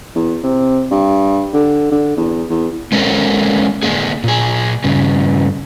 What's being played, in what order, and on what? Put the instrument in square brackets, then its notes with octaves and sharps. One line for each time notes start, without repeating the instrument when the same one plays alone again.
[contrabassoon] E2
C3
G2
D3
D3
E2
E2
[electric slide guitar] G#3 A#3 C#4 A4 A#4 C5
D3 A#3 G#4
A#2 G#4
G2 C#3